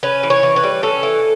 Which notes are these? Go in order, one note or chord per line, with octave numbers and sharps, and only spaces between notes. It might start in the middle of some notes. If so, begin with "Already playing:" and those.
C#4 B4
E3
C#5
E3
B4
G3
C#4 A4
E3